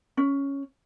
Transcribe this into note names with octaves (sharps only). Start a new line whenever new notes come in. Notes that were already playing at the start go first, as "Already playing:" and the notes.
C#4